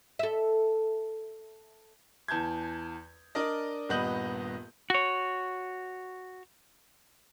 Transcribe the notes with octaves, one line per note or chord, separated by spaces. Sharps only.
A4 E5
E2 A5 G6 G#6
D4 A#4 D5 D#5
D#1 G2 B3 D#5 G6 F#7
F#4 C#5